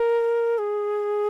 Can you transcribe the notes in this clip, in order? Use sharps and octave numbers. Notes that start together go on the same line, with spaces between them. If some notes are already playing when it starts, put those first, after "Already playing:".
Already playing: A#4
G#4